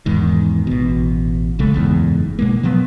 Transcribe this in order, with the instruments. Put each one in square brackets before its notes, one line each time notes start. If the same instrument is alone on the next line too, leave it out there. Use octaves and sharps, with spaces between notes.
[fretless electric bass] E2 G#2 D#3
A1 B2
B1 C#3 G#3 A3
F#1 E2 G#2
B2 G#3 A#3
B2 F3 F#3 B3